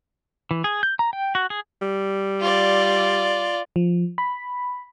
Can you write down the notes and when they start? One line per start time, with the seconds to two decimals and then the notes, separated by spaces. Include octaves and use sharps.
0.51 E3
0.64 G#4
0.83 G6
0.99 A#5
1.13 G5
1.35 F#4
1.50 G#4
1.82 G3
2.40 F4 D5
3.76 F3
4.18 B5